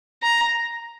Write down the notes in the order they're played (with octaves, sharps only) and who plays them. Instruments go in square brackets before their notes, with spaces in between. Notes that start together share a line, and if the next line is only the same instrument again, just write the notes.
[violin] A#5